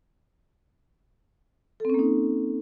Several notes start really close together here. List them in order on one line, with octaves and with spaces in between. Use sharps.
A4 C4 C#4 A#3 D#4